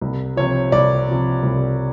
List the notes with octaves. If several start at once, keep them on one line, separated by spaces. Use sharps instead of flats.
C2
C3 F3 C#5
C2 D5
C3 F3
C2